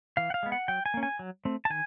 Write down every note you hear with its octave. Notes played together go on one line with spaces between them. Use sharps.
E3 F5
F#5
F5
G#3 B3
F#5
F#3 G5
G#5
A#3 C#4
G#5
F#3
A3 C4
A5
D#3 G#5